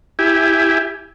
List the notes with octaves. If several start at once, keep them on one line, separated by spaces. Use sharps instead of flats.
E4 G4 G#5